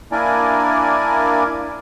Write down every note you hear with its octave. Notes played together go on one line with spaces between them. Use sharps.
A#3 D4 E4 A#4 D5 G#5